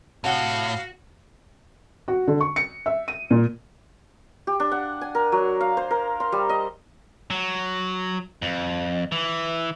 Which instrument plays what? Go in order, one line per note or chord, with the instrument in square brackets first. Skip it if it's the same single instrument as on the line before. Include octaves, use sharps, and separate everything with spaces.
[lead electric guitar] A2 [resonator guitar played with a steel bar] C3 C#5 F#5 [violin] F#4 [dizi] F5
[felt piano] F#4
D3
C#6
C#7
E5
D#7
A#2
[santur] G4
D4
F#5
G#5
A#4
F#3
F5
C5
A#4
C6
G3
D#5
[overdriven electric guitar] F#3
F2
E3